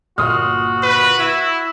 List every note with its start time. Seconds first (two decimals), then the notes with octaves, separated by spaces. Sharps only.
0.18 G1 A#2 F#4 C6 D#6 F6
0.83 B4
1.19 E4 E6